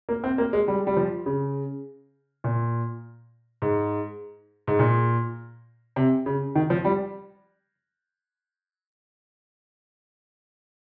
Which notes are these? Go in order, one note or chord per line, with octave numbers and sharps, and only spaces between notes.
A#3
C4
A#3
G#3
G3
G3
F3
C#3
A#2
G#2
G#2
A#2
C3
C#3
D#3
F3
G3